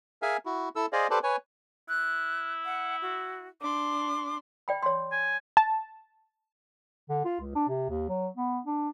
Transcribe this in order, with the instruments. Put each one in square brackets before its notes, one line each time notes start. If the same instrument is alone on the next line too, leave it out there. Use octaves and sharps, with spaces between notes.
[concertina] G#4 A#4 E5 F5 G#5
E4 F#4
E4 A4 E6
G#4 C5 D5 D#5 F5
G4 A4 B4 C5 D5 A5
B4 C#5 G#5
[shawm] E4 [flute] F#6
[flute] F#5
F#4
[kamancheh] D4 C6 [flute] D6
[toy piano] D5 G5 B5
C#5 C6
[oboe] G#5
[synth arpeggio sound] A5
[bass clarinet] D3
F4
C#2
D4
C3
D#2
F#3
B3
D4